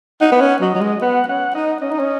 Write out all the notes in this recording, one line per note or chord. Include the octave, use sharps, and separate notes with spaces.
D#4 F#5
B3
C#4
F#3 D#5
F#3
G#3
B3 F#5
C#4 F#5
D#4 D#5
C#4 D#5
D#4
C#4